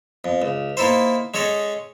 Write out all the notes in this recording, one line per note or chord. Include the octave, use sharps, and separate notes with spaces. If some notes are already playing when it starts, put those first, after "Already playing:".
F2
C#2
A#3 D#4 E4 A4 C5
G#3 C#4 A4 C#5 D#5